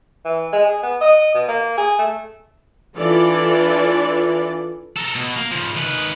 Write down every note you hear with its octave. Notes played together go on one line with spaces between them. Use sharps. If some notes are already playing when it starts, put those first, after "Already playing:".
E3
G#3
G#4
B3
D#5
B2
A#3
G#4
A3
E3 D4 F4 A4 D5
A4 A#4
B2
A#3
C#3 F3
D#3 B4